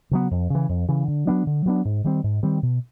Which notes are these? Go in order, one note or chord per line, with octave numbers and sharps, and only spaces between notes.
C#3 F#3 B3
F2
C#3 E3
F2
C#3 E3
D3
F#3 B3 D4
D3
F#3 B3 D4
G#2
D#3 G3 C4
G#2
D#3 G3 C4
B2